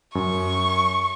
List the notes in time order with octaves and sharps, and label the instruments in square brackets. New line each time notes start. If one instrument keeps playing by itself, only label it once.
[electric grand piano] F#2 [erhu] C#6